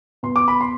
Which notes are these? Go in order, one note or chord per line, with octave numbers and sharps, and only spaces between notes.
B2 C6
D6
B5
C6